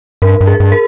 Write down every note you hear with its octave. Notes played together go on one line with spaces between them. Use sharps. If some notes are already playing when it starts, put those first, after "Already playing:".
G2 A#4
G2
G#4
G2
A#4